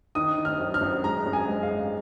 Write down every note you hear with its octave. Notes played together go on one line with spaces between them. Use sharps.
D#3 D#6
D#3
F6
F#2
F6
F#2
G#3 A#5
F#2
G#5
G#3
F5
G#1